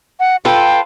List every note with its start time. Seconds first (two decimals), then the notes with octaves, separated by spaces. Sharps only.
0.20 F#5
0.45 F4 A4 B4 G5